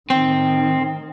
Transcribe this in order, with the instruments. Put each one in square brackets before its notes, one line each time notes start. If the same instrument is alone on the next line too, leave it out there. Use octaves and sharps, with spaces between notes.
[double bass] A2 D#3 [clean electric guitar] C4